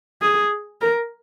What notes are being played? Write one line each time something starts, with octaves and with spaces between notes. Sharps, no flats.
G#4
A#4